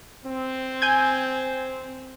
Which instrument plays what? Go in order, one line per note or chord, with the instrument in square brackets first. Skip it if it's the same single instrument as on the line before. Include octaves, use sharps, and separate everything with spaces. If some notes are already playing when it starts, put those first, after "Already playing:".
[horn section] C4
[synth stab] G#5 G6 G#6